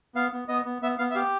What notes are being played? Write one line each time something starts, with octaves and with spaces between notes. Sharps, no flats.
B3 F5
B3
B3 D#5
B3
B3 E5
B3 F5
E5
G4 F5